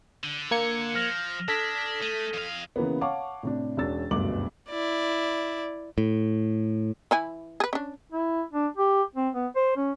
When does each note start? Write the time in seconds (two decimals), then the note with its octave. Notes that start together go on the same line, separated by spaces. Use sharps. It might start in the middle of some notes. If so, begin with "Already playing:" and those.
0.24 D3
0.51 A#3 G#6 C#7
0.95 F3 F6 A#6 F7
1.48 D4 A4 D#6 G#6 A#6 B6
2.02 A3 D#7
2.34 F2 F5
2.76 C#3 E3 A#3 B3
3.01 C#5 F5 F#5 A5 C#6 D6
3.43 A2 C3 D4
3.77 E1 C#4 D4 E6 A6
4.11 F#1 D2 G2 B2 D6 F#7
4.69 E4 D5
5.98 A2
7.11 E3 E4 G#5
7.60 G#4 B4
7.73 C#4 D4
8.12 E4
8.53 D4
8.77 G4
9.15 C4
9.34 B3
9.56 C5
9.77 C#4